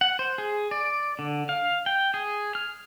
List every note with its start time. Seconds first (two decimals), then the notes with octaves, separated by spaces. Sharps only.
0.01 F#5
0.19 C5
0.38 G#4
0.71 D5
1.19 D3
1.49 F5
1.86 G5
2.14 G#4
2.55 F6